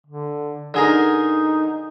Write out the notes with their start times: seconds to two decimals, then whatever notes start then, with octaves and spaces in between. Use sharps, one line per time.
0.07 D3
0.74 D3 D#4 G#4 A#4